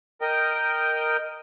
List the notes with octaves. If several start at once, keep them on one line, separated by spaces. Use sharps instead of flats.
A#4 D#5 G5